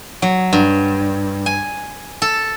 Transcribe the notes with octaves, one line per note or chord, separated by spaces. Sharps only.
F#3
G2
G#5
A4